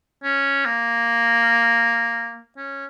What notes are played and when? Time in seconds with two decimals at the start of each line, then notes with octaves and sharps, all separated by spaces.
0.24 C#4
0.66 A#3
2.57 C#4